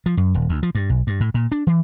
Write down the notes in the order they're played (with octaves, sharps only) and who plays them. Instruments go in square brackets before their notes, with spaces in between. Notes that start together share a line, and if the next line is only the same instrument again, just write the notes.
[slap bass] F3
F#2
D#1
D2
F3
G2
B1
G2
A2
A#2
D4
E3